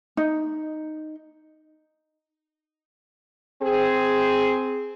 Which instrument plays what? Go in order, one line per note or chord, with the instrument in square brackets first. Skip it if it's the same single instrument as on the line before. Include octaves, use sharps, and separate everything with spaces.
[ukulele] D#4
[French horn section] C4 G#4